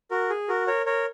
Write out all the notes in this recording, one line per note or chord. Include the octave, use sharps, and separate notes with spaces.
F#4 A#4
G#4
F#4 A#4
A#4 C#5
A#4 C#5